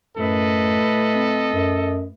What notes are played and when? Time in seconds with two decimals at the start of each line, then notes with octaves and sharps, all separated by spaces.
0.17 F#2 A2 A4 B4 D#5
1.14 C4
1.53 F#2